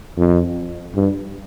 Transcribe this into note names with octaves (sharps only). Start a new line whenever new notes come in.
F2
G2